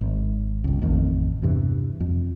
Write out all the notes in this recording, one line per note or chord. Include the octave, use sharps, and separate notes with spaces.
G#1
G1 C#2
A1 F2 D#3
E2 G2 C3 E3
F2